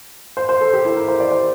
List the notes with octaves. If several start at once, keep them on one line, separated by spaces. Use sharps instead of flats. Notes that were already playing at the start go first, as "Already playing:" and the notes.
C5
C5
A4
G4
E4
A#4
C5
D5
C5